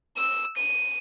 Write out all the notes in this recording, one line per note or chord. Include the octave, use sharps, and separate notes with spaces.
E6
D#7